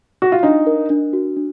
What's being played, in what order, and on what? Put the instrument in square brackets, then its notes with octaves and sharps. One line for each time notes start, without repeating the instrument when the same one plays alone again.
[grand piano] F#4
F4
[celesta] D4 [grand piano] D#4
[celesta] A#4
D4
F#4
D4